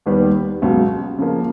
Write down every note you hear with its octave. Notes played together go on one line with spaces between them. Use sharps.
D#2 D#3 G3 B3
C#2 B2 F#3
C#3 F3 A#3